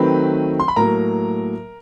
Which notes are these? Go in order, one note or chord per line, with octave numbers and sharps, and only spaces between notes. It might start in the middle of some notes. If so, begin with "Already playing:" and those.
Already playing: D#3 F#3 A3 C4 B4 B5
C6
B5
A2 F#3 A#3 A#4 A#5